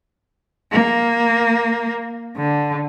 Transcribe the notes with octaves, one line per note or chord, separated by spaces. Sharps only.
A#3
D3